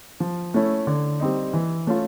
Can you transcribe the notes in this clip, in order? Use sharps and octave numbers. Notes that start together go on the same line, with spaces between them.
F3
A3 C#4 E4
D3
G3 C4 D#4
E3
A3 C#4 F4